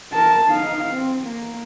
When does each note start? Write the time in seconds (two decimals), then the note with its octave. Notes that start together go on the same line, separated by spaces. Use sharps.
0.13 A#4 A5
0.46 D#4 F5
0.92 C4
1.28 A#3